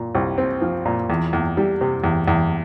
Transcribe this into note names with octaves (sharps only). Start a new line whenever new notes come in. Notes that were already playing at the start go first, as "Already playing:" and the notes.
Already playing: A#2
C2
C4
F3
A#2
E2
E2
G3
C3
E2
E2